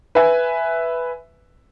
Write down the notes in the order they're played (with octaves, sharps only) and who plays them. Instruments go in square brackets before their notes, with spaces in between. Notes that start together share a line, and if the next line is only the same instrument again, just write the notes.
[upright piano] B4 E5 G#5